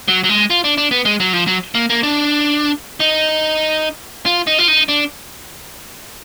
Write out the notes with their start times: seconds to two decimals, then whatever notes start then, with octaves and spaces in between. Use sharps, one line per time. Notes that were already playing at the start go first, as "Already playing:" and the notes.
0.08 F#3
0.24 F#3
0.29 G#3
0.50 F4
0.64 D4
0.77 D4
0.91 B3
1.05 G#3
1.20 F#3
1.33 F3
1.47 F#3
1.75 A#3
1.90 A#3
2.03 D4
3.00 D#4
4.26 F4
4.47 D#4
4.58 F4
4.68 D#4
4.88 D4